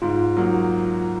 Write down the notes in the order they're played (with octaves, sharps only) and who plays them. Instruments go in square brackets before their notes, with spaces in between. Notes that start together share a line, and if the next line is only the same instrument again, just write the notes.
[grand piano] G#2 [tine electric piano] F4
[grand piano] F#3 A#3 D#4